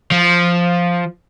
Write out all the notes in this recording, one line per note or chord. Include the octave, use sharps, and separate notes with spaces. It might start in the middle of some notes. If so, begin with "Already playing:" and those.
F3